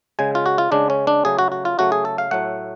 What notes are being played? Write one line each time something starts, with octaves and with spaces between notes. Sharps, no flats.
C#3 G#3 G#5
F4
F#4
F4
C#3 G#3 D4
C#4
D4
C#3 F#3 A3 G#4
F#4
F#4
F4
C#3 F#3 A3 F#4
G#4
A4
F5
A2 F#3 A3 F#5